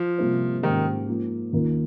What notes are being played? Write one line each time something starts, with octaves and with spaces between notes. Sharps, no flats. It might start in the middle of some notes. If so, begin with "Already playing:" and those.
Already playing: F3
C3 G3 A#3 F4 C5
G#2 D#3 F3 A#3 C#4 G4
G#2 F3 A#3
D#2 D#3 A#3 F4 A#4